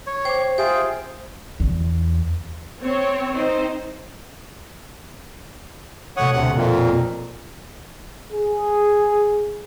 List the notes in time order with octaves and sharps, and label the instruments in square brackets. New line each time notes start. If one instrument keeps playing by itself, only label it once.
[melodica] C#5
[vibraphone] C5 [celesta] G5 D6
[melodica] F4 G#4 G5 [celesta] G4 E5 G#5 [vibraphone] C5
[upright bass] E2
[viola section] C4 C#5
C4 D#4 C5
[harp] B2 A3 D#6 [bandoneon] C#5 F#5
[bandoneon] D2 C3 F#5
F2 A#2
[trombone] G#4